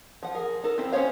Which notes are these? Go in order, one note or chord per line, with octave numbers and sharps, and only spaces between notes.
F3 F#5
G#4 A#4
D#4 A4 A#4
C4 E4
C#4 A4 C5 C#5 F5